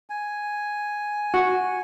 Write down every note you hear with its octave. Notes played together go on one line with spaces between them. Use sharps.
G#5
F#4